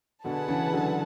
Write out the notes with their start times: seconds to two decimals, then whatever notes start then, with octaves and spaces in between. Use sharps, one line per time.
0.24 B2 D3 G#4 B4 F#5 A5
0.48 C#3 E3
0.72 D3 F#3